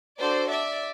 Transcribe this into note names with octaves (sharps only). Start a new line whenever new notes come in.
D4 F#4 A4 C5 D5
D5 E5